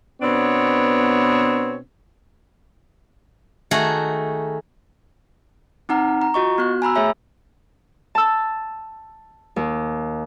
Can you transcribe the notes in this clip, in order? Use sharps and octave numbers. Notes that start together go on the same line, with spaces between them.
B2 B3 C4 D4 C#5
D#3 A3 F#4 G#4
C4 D#4 F#5 A#5 F6
A#5
F4 F#4 D#5 C#6
B3 F#4 F#6
G#5 A#5 B5 E6
A3 G#4 C#5 E5 G#5
A5 E6
D#2